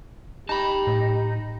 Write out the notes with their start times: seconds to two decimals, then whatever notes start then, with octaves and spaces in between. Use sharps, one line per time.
0.49 D#4 G4 A5 B5
0.87 A2